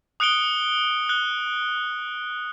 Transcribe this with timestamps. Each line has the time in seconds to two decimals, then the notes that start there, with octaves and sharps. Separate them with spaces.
0.20 D#6 F#6 C#7 D7 G7
1.09 F#6 G7